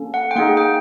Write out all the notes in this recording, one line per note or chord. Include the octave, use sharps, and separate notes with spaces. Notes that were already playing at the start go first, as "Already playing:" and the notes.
Already playing: A#3 C#4 A4
F#5
G5
A#3 D#4 G#4 F#5
G5